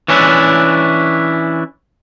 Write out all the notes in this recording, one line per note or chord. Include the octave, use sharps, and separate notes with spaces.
E3 C#4 D4 E4